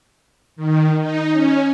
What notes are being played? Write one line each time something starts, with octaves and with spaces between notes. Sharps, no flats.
D#3
D#4
C#4